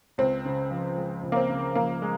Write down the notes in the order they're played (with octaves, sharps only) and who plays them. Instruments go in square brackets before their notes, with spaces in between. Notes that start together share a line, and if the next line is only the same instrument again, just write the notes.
[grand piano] C#2 [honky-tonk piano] C4
[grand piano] C#3
F3
G#3
C#2
[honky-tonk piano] A#3
C4
[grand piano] C#3
[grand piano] F3 [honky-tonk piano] A#3
[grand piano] G#3